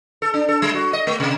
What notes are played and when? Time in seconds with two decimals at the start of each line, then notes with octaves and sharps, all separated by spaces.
0.22 A4
0.34 D4
0.48 A4
0.62 G3
0.74 F#4
0.93 D#5
1.07 A3
1.20 C3